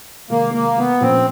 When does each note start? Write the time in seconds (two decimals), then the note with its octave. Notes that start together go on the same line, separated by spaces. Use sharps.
0.30 C3 D#3 G#3 A#3
0.54 A#3
0.78 B3
1.01 A#2 F3 A#3 C4 C#4